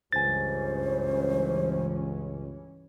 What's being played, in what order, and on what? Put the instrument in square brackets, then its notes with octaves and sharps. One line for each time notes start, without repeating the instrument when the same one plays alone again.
[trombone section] C#2 [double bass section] G2 E3 C#4 [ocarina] C5 [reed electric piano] G#5 A6